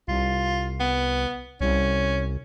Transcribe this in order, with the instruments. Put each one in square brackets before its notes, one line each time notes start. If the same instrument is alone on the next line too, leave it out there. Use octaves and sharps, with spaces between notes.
[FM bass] C2 [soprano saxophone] F4
[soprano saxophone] B3
[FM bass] C2 [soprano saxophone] C#4